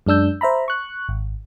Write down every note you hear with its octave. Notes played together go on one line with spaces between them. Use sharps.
F#2 G#3 D4 E6 G6
C5 E5 A#5 B5
C#6 F#6
G#1